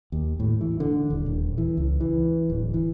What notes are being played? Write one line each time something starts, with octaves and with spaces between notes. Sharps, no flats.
D#2
A2
E3
D3
D#1
D#1
E3
C#2
E3
D1
E3